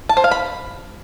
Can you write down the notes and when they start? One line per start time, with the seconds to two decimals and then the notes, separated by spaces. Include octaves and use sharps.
0.09 A5
0.17 C5
0.24 F5
0.31 B5